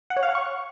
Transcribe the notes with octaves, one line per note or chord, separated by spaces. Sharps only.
F#5
C#5
F5
F#5
C#6